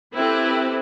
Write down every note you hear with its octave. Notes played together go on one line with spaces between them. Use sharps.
C4 E4 G4 A4 B4